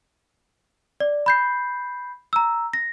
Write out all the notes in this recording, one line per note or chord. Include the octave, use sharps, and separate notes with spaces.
D5
B5 G6 C7
A#5 E6
A#6